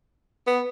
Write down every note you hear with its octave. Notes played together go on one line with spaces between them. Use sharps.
B3